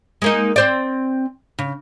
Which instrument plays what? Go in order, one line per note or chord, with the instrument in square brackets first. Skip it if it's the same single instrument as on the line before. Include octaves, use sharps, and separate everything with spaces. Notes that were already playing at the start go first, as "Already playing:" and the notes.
[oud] G#3 A#3 D#4
C4 C5 D5
C#3